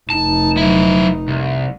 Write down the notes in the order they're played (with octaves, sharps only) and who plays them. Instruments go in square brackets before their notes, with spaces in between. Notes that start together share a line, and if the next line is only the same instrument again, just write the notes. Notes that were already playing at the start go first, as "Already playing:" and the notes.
[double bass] F1 D#4 [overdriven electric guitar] A5
[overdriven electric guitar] F#3 E4
C2